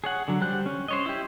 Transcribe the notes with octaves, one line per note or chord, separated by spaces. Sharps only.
G#4 C#5 F#5
D3 F#3
G3 C5 F#6
C#4
C5 C#5 D#5
E4 G4